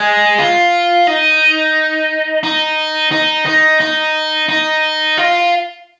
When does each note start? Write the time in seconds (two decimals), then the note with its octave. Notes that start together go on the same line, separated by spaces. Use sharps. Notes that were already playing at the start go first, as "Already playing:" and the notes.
Already playing: G#3
0.38 F4
1.07 D#4
2.43 D#4
3.11 D#4
3.46 D#4
3.80 D#4
4.49 D#4
5.17 F4